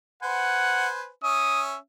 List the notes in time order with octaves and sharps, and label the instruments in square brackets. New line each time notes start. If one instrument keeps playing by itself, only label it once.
[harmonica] B4 C5 G#5 [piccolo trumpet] F#5
[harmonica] C#4 E5 [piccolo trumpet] D#6